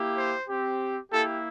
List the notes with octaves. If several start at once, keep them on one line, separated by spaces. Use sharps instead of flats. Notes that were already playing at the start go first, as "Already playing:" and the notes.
Already playing: A#3 E4 G4
C5
C4 G4
A#3 E4 G4 A4